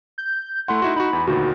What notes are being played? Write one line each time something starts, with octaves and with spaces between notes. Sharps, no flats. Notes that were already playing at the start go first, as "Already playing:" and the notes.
G6
A3 E4 F#5 C6
D#4 E4 F#4 C6
D#4 F#4 B5
E2
D2 A#2 D#3 F#4